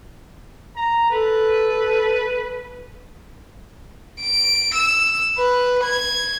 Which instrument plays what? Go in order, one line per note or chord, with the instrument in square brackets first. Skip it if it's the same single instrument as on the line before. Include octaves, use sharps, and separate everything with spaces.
[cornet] A#5
[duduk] A4 [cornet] B4
[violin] D7
E6
B4
G#6